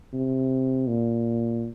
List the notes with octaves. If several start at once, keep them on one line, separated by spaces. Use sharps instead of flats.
C3
A#2